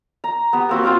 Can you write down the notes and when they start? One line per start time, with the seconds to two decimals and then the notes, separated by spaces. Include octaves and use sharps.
0.24 A#5
0.53 B3 G4
0.69 A#3 C4 F#4
0.83 F4 C5 F5 G5